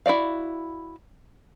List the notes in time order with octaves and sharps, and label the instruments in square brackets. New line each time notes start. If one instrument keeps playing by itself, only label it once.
[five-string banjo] E4 F#4 D5 F5